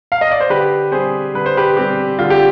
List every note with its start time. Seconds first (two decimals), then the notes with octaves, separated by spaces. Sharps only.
0.12 F5
0.21 D#5
0.31 D5
0.40 C5
0.50 D3 G4 B4
0.92 G3 C4 G#4 C5
1.34 D3 B4
1.46 C5
1.57 G4 B4
1.77 G3 C4 G4
2.19 D3 F4
2.30 G4